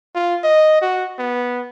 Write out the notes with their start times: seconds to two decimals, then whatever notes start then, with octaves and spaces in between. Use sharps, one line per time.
0.15 F4
0.44 D#5
0.81 F#4
1.19 B3